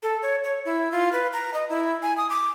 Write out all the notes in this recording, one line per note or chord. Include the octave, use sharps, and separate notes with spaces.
A4
C#5
C#5
E4
F4
B4
A#5
D#5
E4
G#5
D#6
D6